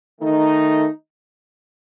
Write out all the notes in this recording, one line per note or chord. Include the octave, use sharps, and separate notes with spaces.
D#3 A3 D#4